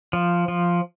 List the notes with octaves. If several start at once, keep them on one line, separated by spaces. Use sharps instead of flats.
F3
F3